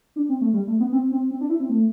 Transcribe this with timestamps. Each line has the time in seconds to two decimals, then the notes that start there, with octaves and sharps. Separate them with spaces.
0.16 D4
0.29 C4
0.41 A3
0.53 G3
0.67 A3
0.80 B3
0.92 C4
1.12 C4
1.31 C4
1.41 D4
1.50 E4
1.60 C4
1.69 A3